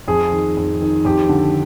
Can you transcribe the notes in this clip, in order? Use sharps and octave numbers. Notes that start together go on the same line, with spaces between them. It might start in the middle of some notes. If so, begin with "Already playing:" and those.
F2 G#4
D#3
F2
D#3
F2 G4
D3